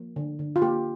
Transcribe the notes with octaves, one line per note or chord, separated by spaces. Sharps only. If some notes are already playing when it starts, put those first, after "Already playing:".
Already playing: F3 A#3
D3
D3
F4
A#3 G4